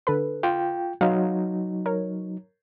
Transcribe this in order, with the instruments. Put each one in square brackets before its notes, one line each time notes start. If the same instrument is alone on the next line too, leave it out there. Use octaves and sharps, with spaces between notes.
[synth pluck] D3 A4 B4
[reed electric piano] F4 G5
[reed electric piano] F#3 D#4 [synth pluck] F5
[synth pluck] A#4 C#5